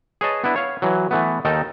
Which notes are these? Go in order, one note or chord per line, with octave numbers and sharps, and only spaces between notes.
G#4 B4 C#5 D#5 A5
B3 D4 E4
C#5 F5
E3 F#3
E3 A3 B3
D#2 D#3 D#4 A4 G5